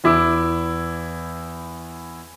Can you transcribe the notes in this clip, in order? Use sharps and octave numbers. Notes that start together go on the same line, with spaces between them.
E2 E4 D6 E6